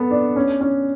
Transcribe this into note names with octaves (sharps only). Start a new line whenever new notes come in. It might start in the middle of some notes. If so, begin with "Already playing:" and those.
Already playing: B3 A4
D4
C#4
C#4